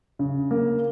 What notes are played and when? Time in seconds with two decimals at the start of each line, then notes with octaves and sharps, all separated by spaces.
0.19 C#3
0.51 A#3